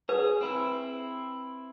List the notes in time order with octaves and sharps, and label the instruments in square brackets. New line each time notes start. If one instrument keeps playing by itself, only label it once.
[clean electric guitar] G#4 [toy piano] B4
[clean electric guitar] C4 E4